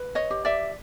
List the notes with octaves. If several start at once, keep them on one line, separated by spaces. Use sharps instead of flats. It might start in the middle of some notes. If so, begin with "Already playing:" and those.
Already playing: B4
C#5 D#5
G4
D5 E5